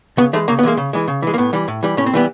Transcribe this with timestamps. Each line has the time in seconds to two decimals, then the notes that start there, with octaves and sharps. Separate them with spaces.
0.17 C#3 B3
0.33 E3 G#3 A3
0.48 C#3 A#3
0.59 B3
0.63 E3 G#3 A#3
0.77 C#3
0.93 E3 G#3
1.08 C#3
1.22 E3 G#3
1.34 A#3
1.38 A2 B3
1.53 E3 G3
1.68 A2
1.83 E3 G3
1.97 A2 C#4
2.06 C4
2.13 E3 G3 B3